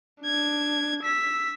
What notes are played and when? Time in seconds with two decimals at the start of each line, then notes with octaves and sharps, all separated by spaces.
0.22 D4 G#6
1.03 E6 B6